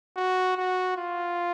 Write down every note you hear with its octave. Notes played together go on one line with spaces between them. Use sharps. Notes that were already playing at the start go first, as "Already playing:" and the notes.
F#4
F#4
F4